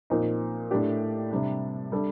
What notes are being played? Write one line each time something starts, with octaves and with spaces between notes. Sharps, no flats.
A#2 F3 C4 D#4
A2 A3 D4 G4
C3 G3 D4
G3 D4 A4